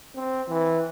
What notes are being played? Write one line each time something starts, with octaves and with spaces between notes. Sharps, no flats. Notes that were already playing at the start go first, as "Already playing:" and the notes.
C4
E3